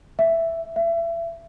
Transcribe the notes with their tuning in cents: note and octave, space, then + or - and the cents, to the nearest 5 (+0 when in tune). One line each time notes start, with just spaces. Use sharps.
E5 +5
E5 +30